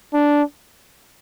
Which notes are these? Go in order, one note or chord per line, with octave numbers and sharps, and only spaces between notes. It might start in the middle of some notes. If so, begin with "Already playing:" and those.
D4